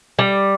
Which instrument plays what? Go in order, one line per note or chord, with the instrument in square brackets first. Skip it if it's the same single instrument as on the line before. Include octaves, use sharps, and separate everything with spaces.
[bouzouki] G3